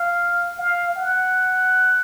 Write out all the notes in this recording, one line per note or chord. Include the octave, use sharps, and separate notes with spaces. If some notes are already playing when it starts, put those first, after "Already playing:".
Already playing: F5
F5
F#5